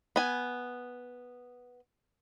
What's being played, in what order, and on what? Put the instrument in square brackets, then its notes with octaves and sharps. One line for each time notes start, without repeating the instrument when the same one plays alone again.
[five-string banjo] B3 G#5